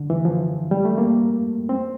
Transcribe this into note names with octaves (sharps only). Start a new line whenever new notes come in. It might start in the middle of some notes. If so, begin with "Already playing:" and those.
Already playing: D3
E3
F3
G3
A3
A#3
C4